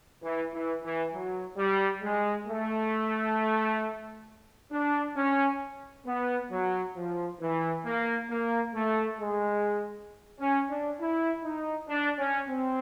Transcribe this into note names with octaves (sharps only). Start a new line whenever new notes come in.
E3
E3
E3
F#3
G3
G#3
A3
D4
C#4
B3
F#3
F3
E3
A#3
A#3
A3
G#3
C#4
D4
E4
D#4
D4
C#4
C4